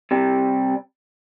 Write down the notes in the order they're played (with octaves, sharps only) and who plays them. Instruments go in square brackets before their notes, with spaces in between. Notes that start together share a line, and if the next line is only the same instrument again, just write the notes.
[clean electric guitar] C3 G3